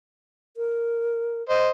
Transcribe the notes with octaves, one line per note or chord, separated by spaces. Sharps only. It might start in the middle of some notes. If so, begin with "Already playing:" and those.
A#4
C5 D#5